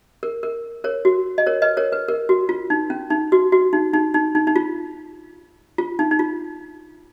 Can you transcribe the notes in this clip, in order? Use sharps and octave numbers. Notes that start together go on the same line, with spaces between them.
A#4
A#4
A#4 C#5
F#4
D#5
A#4 C#5
B4 D#5
A#4 C#5
B4
A#4
F#4
F4
D#4
C#4
D#4
F#4
F#4
D#4
D#4
D#4
D#4
D#4
F4
F4
D#4
D#4
F4